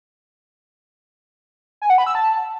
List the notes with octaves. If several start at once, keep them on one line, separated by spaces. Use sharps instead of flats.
G#5
F#5
B5
E6
A5